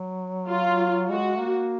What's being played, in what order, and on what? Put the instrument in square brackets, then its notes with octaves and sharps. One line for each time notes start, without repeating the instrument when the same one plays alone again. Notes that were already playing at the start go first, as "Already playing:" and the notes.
Already playing: [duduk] F#3
[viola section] F4
[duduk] G#3 [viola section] F#4
[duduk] A#3